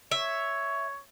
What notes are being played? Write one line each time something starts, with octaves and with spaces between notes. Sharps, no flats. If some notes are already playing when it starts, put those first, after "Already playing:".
C#5 E5